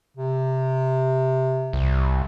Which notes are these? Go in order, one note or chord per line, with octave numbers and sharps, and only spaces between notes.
C3
C2